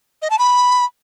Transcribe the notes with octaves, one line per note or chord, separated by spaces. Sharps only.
D#5
A5
B5